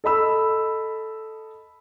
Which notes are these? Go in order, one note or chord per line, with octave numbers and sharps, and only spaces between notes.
A4 D#5 B5 E6